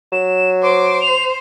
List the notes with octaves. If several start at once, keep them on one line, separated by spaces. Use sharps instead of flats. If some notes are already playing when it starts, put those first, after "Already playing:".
F#3 E7
C5 D6
F7